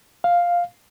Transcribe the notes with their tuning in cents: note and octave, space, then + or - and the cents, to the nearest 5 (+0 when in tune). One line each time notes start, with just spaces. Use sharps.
F5 +5